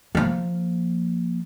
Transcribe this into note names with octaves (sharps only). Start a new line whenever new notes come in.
F3 A#3